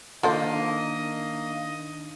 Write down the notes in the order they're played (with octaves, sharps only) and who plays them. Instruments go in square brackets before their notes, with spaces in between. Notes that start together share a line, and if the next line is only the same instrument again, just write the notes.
[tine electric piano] D#3 D4 D#4 [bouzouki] A#3 [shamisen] F4 A4 C5 [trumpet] D#5